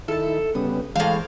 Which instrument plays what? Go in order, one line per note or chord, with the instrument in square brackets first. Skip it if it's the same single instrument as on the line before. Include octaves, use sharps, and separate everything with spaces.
[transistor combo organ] D#3 E4 [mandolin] A4 A5
[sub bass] G1 [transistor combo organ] C#3 G3 B3 [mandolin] D#6
[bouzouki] A2 F5 [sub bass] E3 [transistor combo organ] G#3 [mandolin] A#3 C5